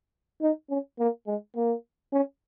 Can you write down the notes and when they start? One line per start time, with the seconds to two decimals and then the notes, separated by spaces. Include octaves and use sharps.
0.42 D#4
0.70 C#4
0.99 A#3
1.27 G#3
1.56 A#3
2.13 C#4